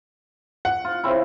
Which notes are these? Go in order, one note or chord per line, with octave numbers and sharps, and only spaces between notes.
F#5
F4
C#3 C4 E4